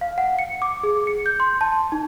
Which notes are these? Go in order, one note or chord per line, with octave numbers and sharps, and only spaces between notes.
F5
F#5
C#7
D6
G#4
C#7
G6
C6
A5
D#4